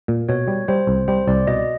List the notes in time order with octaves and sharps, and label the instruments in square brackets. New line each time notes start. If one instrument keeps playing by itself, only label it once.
[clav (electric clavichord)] A#2
[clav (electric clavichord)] B2 [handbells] C#5
[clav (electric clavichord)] G3
[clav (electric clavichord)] G3 [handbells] C5
[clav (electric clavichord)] C2
[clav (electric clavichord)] G3 [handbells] C5
[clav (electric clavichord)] C2 [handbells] D5
[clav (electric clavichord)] B2 [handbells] D#5